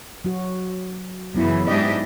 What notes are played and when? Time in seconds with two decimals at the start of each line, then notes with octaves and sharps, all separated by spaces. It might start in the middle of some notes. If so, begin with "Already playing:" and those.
0.25 F#3 F#4
1.35 F#2 C#3 E3 F#3 B3 E4
1.67 G#2 D4 G4 D#5 E5